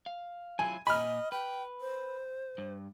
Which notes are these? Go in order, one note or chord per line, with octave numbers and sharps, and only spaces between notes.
F5
F#3 E4 F4 G#5
A#2 D#5 G#5 B5 F6
B4 G5
C5
G2